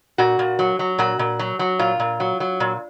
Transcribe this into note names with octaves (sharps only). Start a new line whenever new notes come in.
A#2 F#4
A#2
F#3
F#3
A#2 F#4
A#2
F#3
F#3
A#2 F4
A#2
F#3
F#3
A#2